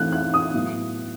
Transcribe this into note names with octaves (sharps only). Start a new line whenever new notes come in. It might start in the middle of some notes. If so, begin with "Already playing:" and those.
Already playing: E3 A3 C4 F#6
F#6
D#6
A2 F#3 B3